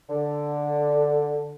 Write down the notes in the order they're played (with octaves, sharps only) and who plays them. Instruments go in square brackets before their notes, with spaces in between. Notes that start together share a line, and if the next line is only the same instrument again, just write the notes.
[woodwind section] D3